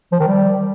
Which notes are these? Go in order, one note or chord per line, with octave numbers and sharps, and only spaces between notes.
F3
D#3
G3